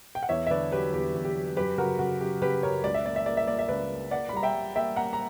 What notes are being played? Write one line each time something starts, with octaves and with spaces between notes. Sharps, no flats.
G5
F#5
E2 C#5 E5
E5
D3 B4 D5
F#3 G4 B4
E2 G4
E2
G4
F#3
F#2 G4 B4
C#3 F#4 A#4
C#3 F#4
F#2 G4
C#3 G4 B4
F#2 A#4 C#5
C#2 D5
E5
A#3 D5
E5
A#3 D5
E5
A#3 D5
E5
C#2 B4 D5
A#3
A#3 D5 F#5
B5
G3 A#5
E5 G5
G3
A#3 E5 G5
A#3 F#5 A#5
A#5